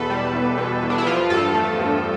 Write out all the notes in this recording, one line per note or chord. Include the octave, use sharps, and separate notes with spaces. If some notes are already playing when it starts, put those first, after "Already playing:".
Already playing: E2 B2 A4 B4
G3
E2
B2
E2
D4
E4
F3 F4
G2 A4
A3
G2